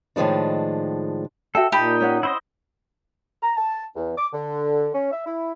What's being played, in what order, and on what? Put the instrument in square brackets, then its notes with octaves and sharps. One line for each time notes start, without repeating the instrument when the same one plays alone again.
[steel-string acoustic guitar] A2 D#3 F3 G#3 D4
[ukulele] F#4 E5 G5 [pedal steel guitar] A4
[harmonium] A#2 [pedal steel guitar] D#4 [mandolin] G4 [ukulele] A5 B5
[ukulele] C#4 C#5 F#5
[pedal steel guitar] E4 C5 D#5
[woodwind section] A#5
A5
E2
D6
D3
C#4
E5
E4